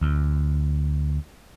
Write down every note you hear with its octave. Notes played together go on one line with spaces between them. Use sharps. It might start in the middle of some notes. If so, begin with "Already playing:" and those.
D2